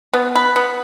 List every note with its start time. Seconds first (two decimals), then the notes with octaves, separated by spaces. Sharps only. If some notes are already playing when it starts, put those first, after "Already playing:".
0.13 B3
0.36 B4
0.56 B3